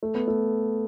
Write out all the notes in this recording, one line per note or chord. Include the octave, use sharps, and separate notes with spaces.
A3
B3
A3